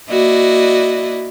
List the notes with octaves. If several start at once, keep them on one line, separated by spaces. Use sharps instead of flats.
A#3 E4 F#4 D5 D#5